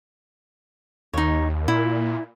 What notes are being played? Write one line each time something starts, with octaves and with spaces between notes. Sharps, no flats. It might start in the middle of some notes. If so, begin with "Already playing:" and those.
D#2 D#4 C#5
A#2 E4